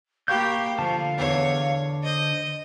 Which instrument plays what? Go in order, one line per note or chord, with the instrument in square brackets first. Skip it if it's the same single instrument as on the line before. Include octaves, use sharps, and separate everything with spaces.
[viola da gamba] A#3 G4 [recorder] F5 [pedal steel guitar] B5 C#6 G6
[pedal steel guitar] D3 A5 [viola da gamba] F3
[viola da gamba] E2 C#5
[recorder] C5 [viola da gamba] D#5